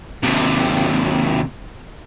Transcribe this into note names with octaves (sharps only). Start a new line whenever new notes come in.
D#2 C3